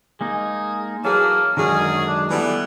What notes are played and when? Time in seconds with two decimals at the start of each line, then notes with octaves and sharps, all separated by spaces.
0.21 G#3 A#3 D#4 G#4
1.05 E3 F#3 A#3 G#4 A5
1.57 F#2 D3 D#3 F#3 G#3 C#4 G#4
2.07 D4
2.31 E3 G3 A3 B3